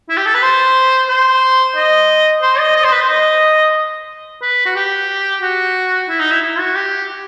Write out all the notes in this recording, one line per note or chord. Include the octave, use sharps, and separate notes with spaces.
E4
G4
A4
B4
C5
C5
D#5
C5
D#5
D#5
C5
B4
C5
D#5
B4
F#4
G4
F#4
E4
D#4
E4
E4
F#4
G4